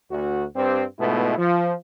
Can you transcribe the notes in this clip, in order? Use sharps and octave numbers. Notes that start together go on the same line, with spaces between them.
D2 F#4
G2 C4 G4
G#2 B2 A3 B3 E4 F4
F3